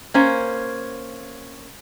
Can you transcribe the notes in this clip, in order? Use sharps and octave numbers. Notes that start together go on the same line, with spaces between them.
A#3 C#4 C5